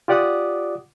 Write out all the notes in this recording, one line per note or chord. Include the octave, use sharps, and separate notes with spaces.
F4 G4 D5 F#5 D6 D#6